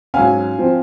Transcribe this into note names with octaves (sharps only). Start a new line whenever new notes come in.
G#2 F#3 C#4 F5 G#5
F3 C4